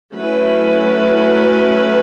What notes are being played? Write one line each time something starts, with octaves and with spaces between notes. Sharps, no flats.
F#3 A3 C#4 E4 B4